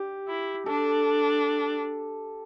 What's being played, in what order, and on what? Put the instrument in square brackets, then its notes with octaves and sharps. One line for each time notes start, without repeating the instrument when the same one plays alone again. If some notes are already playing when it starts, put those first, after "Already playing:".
Already playing: [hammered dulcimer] G4
[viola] E4
[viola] D4 [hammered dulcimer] A4